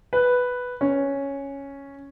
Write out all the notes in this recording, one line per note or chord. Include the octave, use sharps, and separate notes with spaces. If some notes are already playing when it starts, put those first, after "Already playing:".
B4
C#4